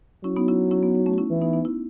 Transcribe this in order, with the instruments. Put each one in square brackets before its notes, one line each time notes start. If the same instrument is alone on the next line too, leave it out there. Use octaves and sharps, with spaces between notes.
[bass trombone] F#3 [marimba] C#4 E4
[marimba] B3 D#4
C#4 E4
C#4 E4
B3 D#4
B3 D#4
A3 C#4
F#4
C#4 E4
[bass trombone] E3
[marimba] B3 D#4
B3 D#4
C#4 E4